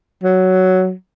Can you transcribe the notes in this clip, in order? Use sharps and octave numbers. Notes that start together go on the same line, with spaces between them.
F#3